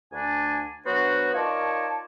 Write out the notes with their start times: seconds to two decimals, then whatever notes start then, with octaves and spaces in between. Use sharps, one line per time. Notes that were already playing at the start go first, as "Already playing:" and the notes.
0.12 D2 D4 G#5
0.85 F#3 B3 D4 F#4 C5
1.34 D#4 F4 A#4 C#5 D5 A5